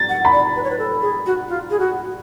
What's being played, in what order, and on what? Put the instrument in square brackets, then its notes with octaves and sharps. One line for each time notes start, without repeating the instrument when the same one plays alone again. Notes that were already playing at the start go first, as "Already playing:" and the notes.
Already playing: [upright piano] A6
[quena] F#5
[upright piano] B5
[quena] D5
B4
C#5
B4
A4
G#4
F#4
F4
G#4
F#4